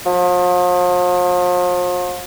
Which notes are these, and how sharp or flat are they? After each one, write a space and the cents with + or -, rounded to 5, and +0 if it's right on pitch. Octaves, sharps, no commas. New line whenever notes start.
F3 +40